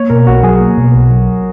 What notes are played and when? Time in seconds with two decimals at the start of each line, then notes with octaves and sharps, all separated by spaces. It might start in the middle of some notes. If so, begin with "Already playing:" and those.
Already playing: A#3 C#5
0.10 B2 A#4
0.27 B1 F#4
0.43 F#3 G#4
0.61 A#3
0.77 B2
0.94 B1
1.10 F#3